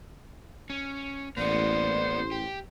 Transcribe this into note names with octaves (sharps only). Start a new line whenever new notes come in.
C#4
A1 A#3 B3 C5 D5
G4